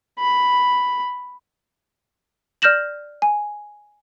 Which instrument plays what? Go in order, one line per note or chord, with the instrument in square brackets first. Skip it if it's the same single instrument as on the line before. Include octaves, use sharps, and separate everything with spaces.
[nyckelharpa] B5
[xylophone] D5 F6 G6 A#6 E7 F#7
G#5